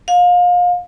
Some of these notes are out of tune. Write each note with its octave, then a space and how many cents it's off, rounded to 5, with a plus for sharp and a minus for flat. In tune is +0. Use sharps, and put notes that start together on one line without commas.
F5 +30